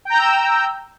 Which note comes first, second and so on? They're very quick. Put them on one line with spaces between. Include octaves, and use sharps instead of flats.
G5 A#5 G6 E6